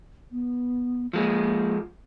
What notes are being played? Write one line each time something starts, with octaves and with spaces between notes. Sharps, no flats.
B3
F3 G#3 A#3